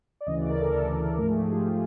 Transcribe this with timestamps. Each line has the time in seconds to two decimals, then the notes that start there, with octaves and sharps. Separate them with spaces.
0.21 D5
0.27 D2 C#3 E3 D#5
0.39 D5
0.50 A#4
0.61 A4
0.73 D2 C#3 E3
1.18 G#2 F3 A3 A#4
1.30 G#4
1.41 G4
1.52 F4
1.64 F3 A3 F4